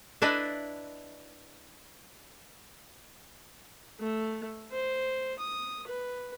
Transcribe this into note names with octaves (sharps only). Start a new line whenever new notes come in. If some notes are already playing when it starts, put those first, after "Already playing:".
D4 E4 B4 D5 D#5
A3
C5
D#6
B4